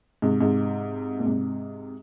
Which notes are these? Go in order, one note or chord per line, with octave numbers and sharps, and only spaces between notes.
G#2 C3
G#2 C3
A#2
G#2 C3